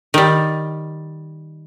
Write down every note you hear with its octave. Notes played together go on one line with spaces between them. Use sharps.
D#3 G3